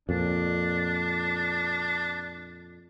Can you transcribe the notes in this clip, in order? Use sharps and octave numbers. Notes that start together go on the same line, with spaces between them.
F2 A#2 D4